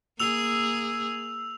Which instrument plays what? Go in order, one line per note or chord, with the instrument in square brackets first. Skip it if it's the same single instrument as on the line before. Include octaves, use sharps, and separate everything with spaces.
[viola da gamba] A#3 G#4 [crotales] E6 F7